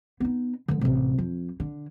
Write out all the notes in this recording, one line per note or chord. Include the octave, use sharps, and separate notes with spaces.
B3 D#4
D3 D#3
A1 C3
F2
D3